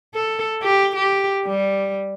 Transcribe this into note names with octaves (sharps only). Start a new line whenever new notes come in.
A4
G4
G4
G3